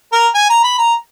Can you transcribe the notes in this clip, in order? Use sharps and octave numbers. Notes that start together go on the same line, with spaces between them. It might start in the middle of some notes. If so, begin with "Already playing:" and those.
A#4
G#5
A#5
B5
A#5